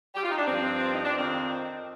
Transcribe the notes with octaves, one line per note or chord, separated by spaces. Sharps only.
G4
F4
D#4
D4
G2 F3 C4
F4
D#4
D4
F2 D#3 C4